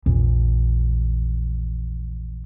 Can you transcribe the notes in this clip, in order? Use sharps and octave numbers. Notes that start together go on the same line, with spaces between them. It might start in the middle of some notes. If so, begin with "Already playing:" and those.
A#1 E2